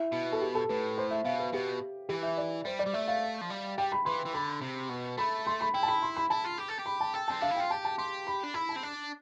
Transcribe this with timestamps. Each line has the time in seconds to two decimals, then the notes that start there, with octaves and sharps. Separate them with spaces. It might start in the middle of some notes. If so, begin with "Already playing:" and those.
Already playing: E4
0.12 B2
0.33 A4
0.42 G4
0.55 A4
0.69 A2 B4
0.98 C5
1.11 E5
1.25 B2 F5
1.39 B4
1.53 B2 G4
2.09 E3 G4
2.23 E5
2.38 D5
2.65 G3 C5
2.79 D5
2.86 G3
2.93 A3 E5
3.08 F5
3.41 F3
3.50 G3
3.78 G3 G5
3.92 B5
4.05 E3 C6
4.26 E3
4.33 D3 B5
4.62 C3
4.90 B2
5.18 A3 B5
5.47 C6
5.61 B5
5.74 E4 G5
5.83 A5
5.88 B5
6.03 C6
6.17 B5
6.30 E4 A5
6.44 F4
6.58 G4
6.68 A4
6.79 G4
6.86 B5
7.01 A5
7.14 A4 G5
7.28 C4 A5
7.41 D4 F5
7.51 E4
7.56 G5
7.60 F4
7.70 G4 A5
7.85 A5
7.98 G4 C6
8.27 B5
8.43 D4
8.54 E4 B5
8.69 A5
8.76 C4
8.83 D4